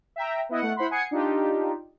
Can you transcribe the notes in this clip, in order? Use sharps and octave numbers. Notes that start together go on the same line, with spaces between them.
E5 G5 A#5
B3 E4 D#5 F#5
A3 F#5
E4 C5 F#5 B5 C6
F#5 G#5 D#6 G#6 C7 C#7
D4 D#4 F4 G4